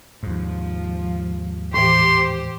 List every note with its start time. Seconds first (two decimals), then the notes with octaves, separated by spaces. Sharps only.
0.23 D#2 G#2 F3
1.74 A2 E3 G4 C5 C6